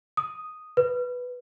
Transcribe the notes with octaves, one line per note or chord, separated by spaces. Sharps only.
D#6
B4